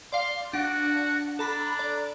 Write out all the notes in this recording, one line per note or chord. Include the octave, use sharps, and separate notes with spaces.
D5 F5 C6
D4 F#4 F#5
D4 A4 A#5 B5
D5